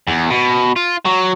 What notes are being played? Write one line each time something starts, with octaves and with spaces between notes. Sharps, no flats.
E2
B2
F4
F#3